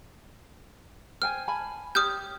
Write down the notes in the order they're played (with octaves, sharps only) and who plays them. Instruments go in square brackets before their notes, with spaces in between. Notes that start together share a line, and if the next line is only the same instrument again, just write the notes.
[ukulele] C5 G5 G#5 [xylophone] F6
[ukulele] G#5 A5 B5
[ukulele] G4 C#5 [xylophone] D#6 F6 G6